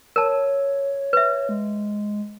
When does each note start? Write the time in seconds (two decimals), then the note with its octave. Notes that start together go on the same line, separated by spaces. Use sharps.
0.16 A#4 C#5 A5
1.13 B4 E5
1.49 G#3